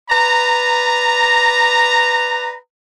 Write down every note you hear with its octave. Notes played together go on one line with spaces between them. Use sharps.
B4 D5 A#5